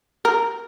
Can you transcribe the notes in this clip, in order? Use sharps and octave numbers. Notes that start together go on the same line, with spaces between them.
A#4